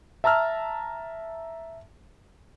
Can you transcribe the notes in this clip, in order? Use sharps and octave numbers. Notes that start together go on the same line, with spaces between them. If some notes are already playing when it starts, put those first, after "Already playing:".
E5 A5 A#5 E6 F6